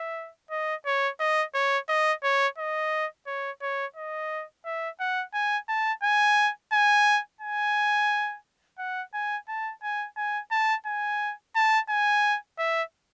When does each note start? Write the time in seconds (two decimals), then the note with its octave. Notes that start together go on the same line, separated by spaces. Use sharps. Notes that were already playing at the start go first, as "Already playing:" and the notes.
Already playing: E5
0.51 D#5
0.86 C#5
1.20 D#5
1.54 C#5
1.89 D#5
2.23 C#5
2.58 D#5
3.27 C#5
3.62 C#5
3.96 D#5
4.65 E5
5.00 F#5
5.34 G#5
5.68 A5
6.03 G#5
6.73 G#5
7.41 G#5
8.79 F#5
9.13 G#5
9.48 A5
9.83 G#5
10.17 G#5
10.51 A5
10.86 G#5
11.55 A5
11.89 G#5
12.58 E5